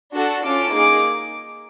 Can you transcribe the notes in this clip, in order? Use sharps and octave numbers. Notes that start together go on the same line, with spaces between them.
D4 F#4 A4
C#4 F4 A4 D6
A#3 D#4 G#4 D6